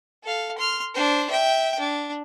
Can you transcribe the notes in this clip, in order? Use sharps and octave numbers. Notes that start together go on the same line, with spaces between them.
A4 F5
C6 F6
D4 C5
E5 G5
D4